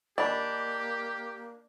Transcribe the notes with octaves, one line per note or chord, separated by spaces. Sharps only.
A#3 D4 G4 D#5 B5